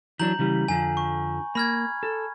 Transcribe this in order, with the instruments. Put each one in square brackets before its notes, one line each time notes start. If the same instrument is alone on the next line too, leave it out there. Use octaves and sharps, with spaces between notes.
[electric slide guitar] E3 F#3 D4 [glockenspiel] A#5 G6 F#7
[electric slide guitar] C#3 E3 G3
[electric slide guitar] F2 D3 F3 [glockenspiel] G#5
[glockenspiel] C#6
[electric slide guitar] A#3 [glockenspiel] B5 F6 G#6
[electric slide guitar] A4